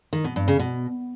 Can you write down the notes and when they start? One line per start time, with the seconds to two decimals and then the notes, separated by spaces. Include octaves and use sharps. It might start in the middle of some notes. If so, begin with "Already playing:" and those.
0.13 D#3
0.24 B2
0.36 G2
0.48 C#3
0.59 B2